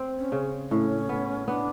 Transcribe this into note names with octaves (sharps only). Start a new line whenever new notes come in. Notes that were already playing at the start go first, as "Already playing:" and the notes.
Already playing: C4
C#4
C#3
A2 C#4
B3
B3 D4